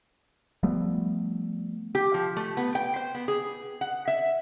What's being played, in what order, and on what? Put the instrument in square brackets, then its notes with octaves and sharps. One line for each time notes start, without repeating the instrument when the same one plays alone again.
[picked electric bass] F3 G3 A3 B3
[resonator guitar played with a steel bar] G4
F3
A3
B3
G5
C5
B3
G#4
F#5
E5